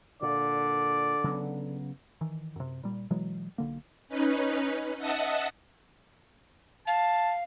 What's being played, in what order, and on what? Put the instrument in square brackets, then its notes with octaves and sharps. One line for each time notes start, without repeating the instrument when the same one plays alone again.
[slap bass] A#2 [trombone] D3 [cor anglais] D5
[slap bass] C#3 F#3 B3
[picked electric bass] D#3 E3
F#2 C3
A#2 G3
B2 E3 F#3 G#3
B1 D3 A#3
[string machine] C#4 D#4 B4
D#5 E5 F#5 A5 D#6
[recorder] F5 [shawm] A5